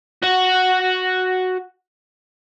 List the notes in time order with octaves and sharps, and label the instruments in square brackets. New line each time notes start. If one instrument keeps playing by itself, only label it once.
[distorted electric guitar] F#4 F#5